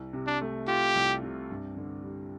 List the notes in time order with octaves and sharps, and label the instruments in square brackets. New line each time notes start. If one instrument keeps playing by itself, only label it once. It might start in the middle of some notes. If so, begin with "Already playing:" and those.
Already playing: [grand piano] C2
C3
[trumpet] D4
[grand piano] A3
[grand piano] F4 [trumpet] G4
[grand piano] C2
C3
G2
D3
G3